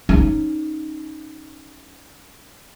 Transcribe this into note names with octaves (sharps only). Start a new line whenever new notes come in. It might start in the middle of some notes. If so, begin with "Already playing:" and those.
C#4 D#4